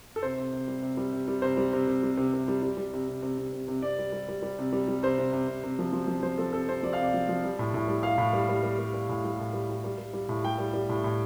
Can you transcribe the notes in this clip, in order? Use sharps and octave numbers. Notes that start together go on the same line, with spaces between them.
A4
C3 C5
C3
C3
G3
C3
G3
C3
G3
C3 C5
G3
C3
C3
G3
C3
C3
G3
G3
G3
C3
C3
C3
C3
C3
C3
C3 D5
G3
G3
G3
G3
C3
G3
G3
C3 C5
C3
C3
C3
C3
F3
F3
F3
F3 C5
F3 A4
C3 A4
C3 C5
F3 D5
F5
C3 D5
F3
F3
G3
A2
A2
G3
G3 F5
A2
G3
G3
G3
G3
G3
A2
G3
A2
G3
G3
G3
G3
G3
A2
G3 G5
G3
G3
A2
A2